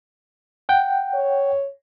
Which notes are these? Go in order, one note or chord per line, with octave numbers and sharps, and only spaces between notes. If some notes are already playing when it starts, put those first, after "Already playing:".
F#5 G5
C#5